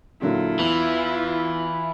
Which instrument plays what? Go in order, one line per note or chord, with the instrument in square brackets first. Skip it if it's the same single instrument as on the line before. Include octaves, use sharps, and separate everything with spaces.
[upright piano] A#2 D3 F#3 [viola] E4 F4
[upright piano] E2 [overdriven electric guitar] E3